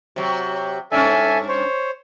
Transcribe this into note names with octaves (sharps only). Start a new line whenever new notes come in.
C3 F#3
G2 C#4 D4 A4 E5 G#5
C5 C#5